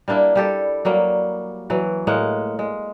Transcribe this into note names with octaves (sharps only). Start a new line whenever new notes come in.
G3 A#3 D4 E4
G3 G4 A4
F#3 G3 A#3
E3 F#3
A2 G#3 A#3 F#5
G#3